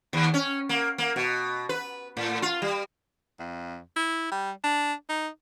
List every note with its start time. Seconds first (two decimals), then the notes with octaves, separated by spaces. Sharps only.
0.13 D#2
0.34 C#4
0.69 A#3
0.98 A#3
1.16 B2
1.69 B4
2.17 A2
2.42 F4
2.62 G3
3.40 F2
3.96 E4
4.32 G3
4.64 D4
5.09 D#4